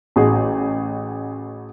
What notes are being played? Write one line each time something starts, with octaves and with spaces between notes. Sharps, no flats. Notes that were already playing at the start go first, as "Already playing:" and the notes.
A1 F#4 G#4